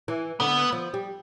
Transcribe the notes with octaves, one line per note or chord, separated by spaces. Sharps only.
E3
D3 B3
F3
G3